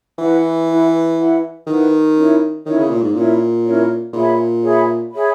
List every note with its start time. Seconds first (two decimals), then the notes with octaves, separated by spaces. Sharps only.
0.18 E3 E4 B4 F#5
0.68 E4 B4 F#5
1.17 E4 B4 F#5
1.67 D#3 E4 B4 F#5
2.16 C#4 E4 A#4 C#5
2.66 D#3 C#4 E4 A#4 C#5
2.78 C#3
2.90 A#2
3.02 G#2
3.14 A#2 C#4 E4 A#4 C#5
3.64 C#4 E4 A#4 C#5
4.13 A#2 G#4 C#5 E5 B5
4.62 G#4 C#5 E5 B5
5.12 G#4 C#5 E5 B5